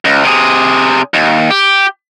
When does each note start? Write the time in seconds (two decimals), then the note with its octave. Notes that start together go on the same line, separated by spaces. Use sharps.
0.05 C#2
0.24 C3 G#4
1.14 D#2
1.51 G4